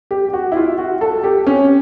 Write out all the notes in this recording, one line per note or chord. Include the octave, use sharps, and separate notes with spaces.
G4
G4
F#4
E4
F4
F#4
A4
G4
C#4